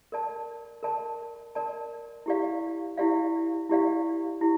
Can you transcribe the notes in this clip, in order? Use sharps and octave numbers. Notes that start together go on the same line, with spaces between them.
A#4 D5 A5
A#4 D5 A5
A#4 D5 A5
E4 G4 D5 F5
E4 G4 D5 F5
E4 G4 D5 F5
E4 G4